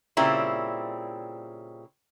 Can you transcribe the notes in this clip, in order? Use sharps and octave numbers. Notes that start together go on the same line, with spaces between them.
A#2 C#3 G3 C4 E4